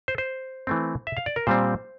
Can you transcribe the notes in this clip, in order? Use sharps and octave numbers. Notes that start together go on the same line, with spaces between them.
C5
C5
E3 A3 C4
E5
F5
D5
A#4
A#2 G3 C4 C5